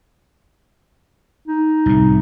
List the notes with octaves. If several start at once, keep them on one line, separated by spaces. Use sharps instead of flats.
D#4
C2 A2